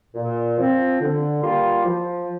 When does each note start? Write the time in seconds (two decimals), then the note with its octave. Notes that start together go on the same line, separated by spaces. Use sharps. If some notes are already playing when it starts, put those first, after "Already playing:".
0.15 A#2
0.58 F3 C4
1.00 D3
1.42 G3 A#3 F4
1.85 F3